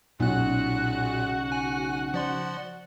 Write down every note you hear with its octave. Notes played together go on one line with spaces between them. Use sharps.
B1 A#2 C#3 F#4 F#5 F#6
G#5
F3 D5 C6